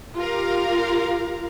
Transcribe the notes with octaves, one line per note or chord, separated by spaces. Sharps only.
F4 G4 A#4 F5